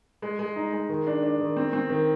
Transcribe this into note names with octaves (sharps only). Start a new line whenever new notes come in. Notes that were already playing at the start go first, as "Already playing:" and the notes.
G#3
G#3
D#4
G#3
D#3
D4
D4
D#3
C4
C4
D#3